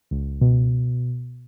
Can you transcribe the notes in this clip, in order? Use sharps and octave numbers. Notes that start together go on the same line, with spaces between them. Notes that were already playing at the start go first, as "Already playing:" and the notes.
C#2
B2